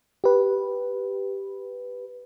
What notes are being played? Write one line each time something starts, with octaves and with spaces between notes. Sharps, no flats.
G4 B4